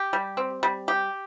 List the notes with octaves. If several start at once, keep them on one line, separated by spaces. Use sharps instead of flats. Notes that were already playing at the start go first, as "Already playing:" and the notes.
Already playing: G4
G3
C4
G3
G4